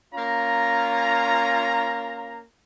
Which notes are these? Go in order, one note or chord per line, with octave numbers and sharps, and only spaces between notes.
A#3 C#4 F4 A#5